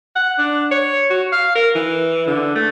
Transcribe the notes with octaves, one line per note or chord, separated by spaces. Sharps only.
F#5
D4
C#5
F#4
F5
A#4
E3
D3
A3